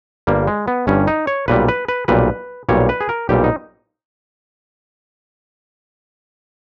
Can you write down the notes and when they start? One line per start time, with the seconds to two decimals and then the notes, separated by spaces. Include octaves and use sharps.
0.27 G1 G2 G3 A#3
0.47 G#3
0.68 B3
0.87 G1 G2 G3 C#4
1.07 D#4
1.27 C#5
1.48 B1 A#2 G3 B4
1.68 B4
1.88 B4
2.08 B1 A#2 G3 B4
2.69 B1 A#2 G3 C#5
2.89 B4
3.01 G#4
3.09 A#4
3.29 B1 A#2 G3 G4
3.44 D#4